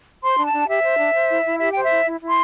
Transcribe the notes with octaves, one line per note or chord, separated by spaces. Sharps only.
C5 C6
D4
A5
D4
G4 E5
C5
D4
C5
E4
E4
G4 E5
C5 G5
E5
E4
E4
E4
C6